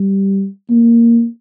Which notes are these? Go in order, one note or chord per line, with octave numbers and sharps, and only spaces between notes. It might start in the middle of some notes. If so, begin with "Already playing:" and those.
Already playing: G3
A#3